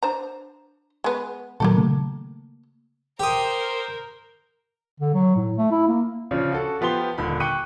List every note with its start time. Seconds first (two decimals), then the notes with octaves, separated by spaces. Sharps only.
0.03 D4 C5 A#5
1.04 G#3 B3
1.60 A#2 D#3 F#3 A#3 G4 A4
1.77 C#3 A3
3.20 G4 A#4 C5 D#6
5.00 D3
5.14 F#3
5.36 A2
5.57 A3
5.71 E4
5.87 A#3
6.31 C#3 F3 C#4 D4
6.53 F#4 A4
6.81 F3 B3 G4 C6 G7
7.18 D#1 D3 B5
7.40 G5 C#6 D6 F#6 C#7 D#7